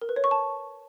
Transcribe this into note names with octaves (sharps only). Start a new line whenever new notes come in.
A#4
B4
C#5
C#6
A5